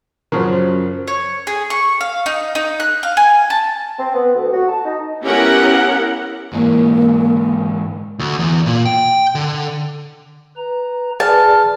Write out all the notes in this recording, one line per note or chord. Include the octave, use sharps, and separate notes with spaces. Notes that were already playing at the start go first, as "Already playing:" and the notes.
F#2 C#3 F3 F#3 A#4 C5
C#5
G#4
C#6
F5
D#4
D#4
F#6
F5
G#5
A5
C4
B3
D2
F#4
A5
D#4
B3 C#4 E4 G4 A#4 F#5
G#2 E3 A#3
D2
E2
A#2
G5
D3
B4 A#5
G#4 B4 D5 A5 F6